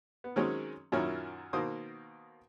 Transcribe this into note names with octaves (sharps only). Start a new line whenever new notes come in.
B3
D#3 F#3 G#3 C4 C#4
F#2 A#2 D#3 C#4 E4
B2 D#3 A#3 C5 D#6